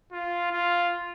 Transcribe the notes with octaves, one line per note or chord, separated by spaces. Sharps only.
F4
F4